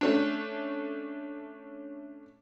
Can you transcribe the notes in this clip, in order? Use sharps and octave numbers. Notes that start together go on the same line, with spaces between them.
A3 C#4 D4